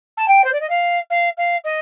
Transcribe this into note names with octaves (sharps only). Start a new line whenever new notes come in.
A5
G5
C5
D5
D#5
F5
F5
F5
D#5